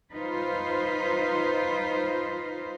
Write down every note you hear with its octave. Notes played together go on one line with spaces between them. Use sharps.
D#4 F4 B4 C5